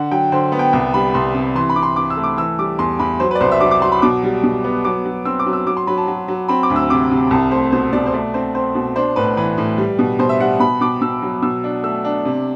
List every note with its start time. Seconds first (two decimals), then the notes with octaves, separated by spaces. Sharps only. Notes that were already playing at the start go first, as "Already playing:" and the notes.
Already playing: D3 F#5
0.11 F#3 G5
0.32 D3 C5
0.52 B3
0.59 G5
0.73 C2 G5
0.94 G3 B5
1.14 C2 C6
1.35 C3
1.55 E3 C6
1.69 B5
1.76 C3 D6
1.83 C6
1.96 C3 D6
2.10 E6
2.17 A3
2.24 D6
2.37 E3 E6
2.59 G3 D6
2.79 E2 C6
2.99 E2 B5
3.20 F#3 C5
3.31 B4
3.35 D5
3.41 C2 C5
3.51 E5
3.61 F#3 D6
3.71 D6
3.82 F#3 C6
3.92 B5
4.02 B2 D6
4.23 G3
4.43 B2
4.64 B3
4.85 F#3 D6
5.05 F#3
5.25 C4 E6
5.39 D6
5.46 F#3
5.53 E6
5.67 F#3 D6
5.77 C6
5.87 F#3 B5
5.98 A5
6.08 F#3
6.28 F#3
6.48 C4 B5
6.63 D6
6.70 D2
6.76 E6
6.90 C3 D6
7.11 C3
7.31 C2 A5
7.51 A3 C5
7.72 B2 C5
7.93 B2 D5
8.06 C5
8.14 A3 D5
8.34 C4 C5
8.55 C4 C5
8.75 B2
8.96 D4 C5
9.16 A2 B4
9.37 E3 B4
9.58 A2
9.78 G3
9.99 B2
10.19 B2 C5
10.29 E5
10.40 G3 F#5
10.60 B2 B5
10.81 B2 D6
11.01 B2 E6
11.22 F#3
11.42 B2 E6
11.64 D4
11.83 A3 E6
12.05 D4
12.25 C3